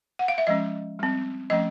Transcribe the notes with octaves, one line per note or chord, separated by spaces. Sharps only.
F#5
F5
E5
F3 G#3 C#4 D#5
G3 C4
F3 A3 C#4 D#5